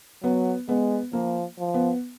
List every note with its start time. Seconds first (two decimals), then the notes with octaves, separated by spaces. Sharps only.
0.23 F#3 B3
0.68 G#3 B3
1.13 F3 A#3
1.59 F3
1.74 B3